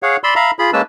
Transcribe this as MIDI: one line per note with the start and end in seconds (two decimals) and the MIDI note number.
0.03 0.17 68
0.03 0.17 73
0.03 0.17 77
0.03 0.17 78
0.24 0.34 74
0.24 0.34 83
0.24 0.34 84
0.24 0.34 88
0.36 0.51 76
0.36 0.51 77
0.36 0.51 82
0.36 0.51 83
0.59 0.71 65
0.59 0.71 68
0.59 0.71 83
0.73 0.82 56
0.73 0.82 58
0.73 0.82 61
0.73 0.82 71
0.73 0.82 81
0.73 0.82 88